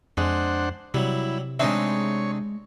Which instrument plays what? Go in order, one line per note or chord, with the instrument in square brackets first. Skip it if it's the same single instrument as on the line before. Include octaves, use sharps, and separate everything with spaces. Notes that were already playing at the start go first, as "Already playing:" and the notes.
[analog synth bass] F2 [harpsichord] G#3 [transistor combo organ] D4 C5 F#5
[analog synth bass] C3 [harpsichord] F#3 G3 [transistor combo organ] E4
[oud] G#3 E5 [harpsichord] C4 D4 D#4 [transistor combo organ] C#5